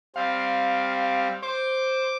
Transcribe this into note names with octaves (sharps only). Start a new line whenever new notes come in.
G3 C4 F5
C5 D6